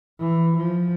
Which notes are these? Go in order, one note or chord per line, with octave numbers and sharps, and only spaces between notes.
E3
F3